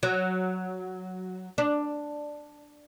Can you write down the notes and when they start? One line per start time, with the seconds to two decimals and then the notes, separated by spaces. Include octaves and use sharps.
0.03 F#3
1.58 D4